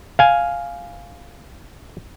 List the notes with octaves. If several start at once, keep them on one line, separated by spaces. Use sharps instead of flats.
F5 G#5